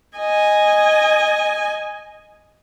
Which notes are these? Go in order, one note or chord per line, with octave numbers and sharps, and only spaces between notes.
D#5 G#5